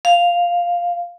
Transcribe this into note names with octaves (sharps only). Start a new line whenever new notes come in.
F5